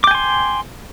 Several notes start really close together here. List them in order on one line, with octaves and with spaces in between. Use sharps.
D6 G5 G#5 C6